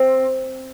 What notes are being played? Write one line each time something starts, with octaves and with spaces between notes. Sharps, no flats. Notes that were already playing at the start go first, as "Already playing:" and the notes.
Already playing: C4